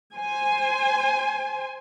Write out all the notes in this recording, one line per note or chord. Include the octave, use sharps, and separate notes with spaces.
C5 G#5